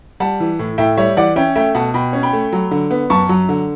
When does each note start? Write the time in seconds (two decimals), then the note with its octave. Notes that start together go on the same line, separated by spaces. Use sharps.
0.20 G3 F#5 A5
0.40 E3
0.59 A2
0.78 A2 E5 G5
0.97 G3 C#5 E5
1.17 E3 D5 F#5
1.36 C#4 E5 G5
1.56 A3 E5 G5
1.75 B2 F#5 A5
1.94 B2 G5 B5
2.13 C#4
2.23 G5 B5
2.33 A3
2.52 F#3
2.71 D3
2.91 B3
3.10 F#2 A5 C#6
3.29 F#3
3.49 D3